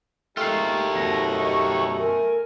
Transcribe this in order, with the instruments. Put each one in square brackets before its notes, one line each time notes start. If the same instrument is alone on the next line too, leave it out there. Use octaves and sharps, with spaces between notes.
[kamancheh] G#3 [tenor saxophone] A3 [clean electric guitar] F4 F5 [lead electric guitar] G4 A#4
[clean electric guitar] F#2 B2 D3 [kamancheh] A#5
[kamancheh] D#5 C#6
A#4 G#5